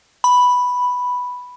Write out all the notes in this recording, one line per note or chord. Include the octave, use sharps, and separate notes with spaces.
B5